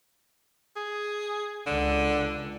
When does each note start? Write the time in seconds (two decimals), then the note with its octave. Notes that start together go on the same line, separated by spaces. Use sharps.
0.76 G#4
1.66 C#2 D3